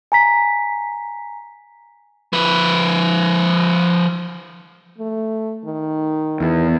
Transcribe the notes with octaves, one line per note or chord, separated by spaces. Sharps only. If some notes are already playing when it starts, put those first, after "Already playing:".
G#5 A#5 B6
F3 B4
A3
D#3
E2